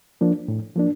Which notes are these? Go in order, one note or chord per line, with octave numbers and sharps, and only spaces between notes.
F3 A#3 D4
A2
F3 A#3 D4